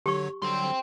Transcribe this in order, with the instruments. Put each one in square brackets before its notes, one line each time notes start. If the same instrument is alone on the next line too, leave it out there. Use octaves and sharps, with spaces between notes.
[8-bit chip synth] D3 F#3 C#5 [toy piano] G4 C#6
[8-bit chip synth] D3 F#3 G3 [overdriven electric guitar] G5 C6